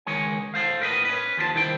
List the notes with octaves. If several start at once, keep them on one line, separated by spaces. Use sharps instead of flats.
C#2 D#3 G#3 C#5 G#5
A4 C5 F5
A2 A#4 B4 D#5
C#4 B4
D#2 F3 A4 A5
C2 D#3 E4 C5 G5